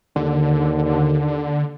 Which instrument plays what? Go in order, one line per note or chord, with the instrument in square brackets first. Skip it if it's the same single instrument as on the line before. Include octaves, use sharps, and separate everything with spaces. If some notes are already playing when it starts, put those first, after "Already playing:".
[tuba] D#2 [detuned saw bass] D3